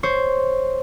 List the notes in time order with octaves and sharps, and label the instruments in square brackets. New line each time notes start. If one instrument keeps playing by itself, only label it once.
[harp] C5 C#5